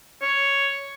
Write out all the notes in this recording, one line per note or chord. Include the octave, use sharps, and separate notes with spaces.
C#5